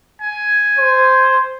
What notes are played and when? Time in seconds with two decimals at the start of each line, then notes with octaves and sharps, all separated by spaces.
0.21 G#5
0.79 C5